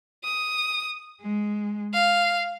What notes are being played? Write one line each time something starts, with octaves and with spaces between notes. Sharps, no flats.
D#6
G#3
F5